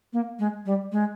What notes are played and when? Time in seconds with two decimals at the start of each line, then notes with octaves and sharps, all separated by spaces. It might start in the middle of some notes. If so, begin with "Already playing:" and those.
0.13 A#3
0.39 G#3
0.66 G3
0.92 G#3